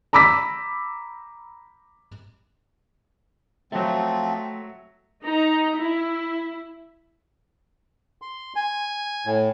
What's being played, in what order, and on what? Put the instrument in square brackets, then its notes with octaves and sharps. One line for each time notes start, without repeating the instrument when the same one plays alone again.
[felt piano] A#5 B5 D6 E6 B6
[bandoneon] F3 C4 [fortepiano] F#3 E5 [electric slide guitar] A3
[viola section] D#4 A#5
E4
[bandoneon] C6
G#5
A2